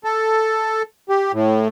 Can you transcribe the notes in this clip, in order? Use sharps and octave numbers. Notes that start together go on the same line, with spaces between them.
A4
G4
A2